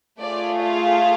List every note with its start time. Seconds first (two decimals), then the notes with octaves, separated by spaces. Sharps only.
0.21 A3 F4 G#4 D5
0.61 F5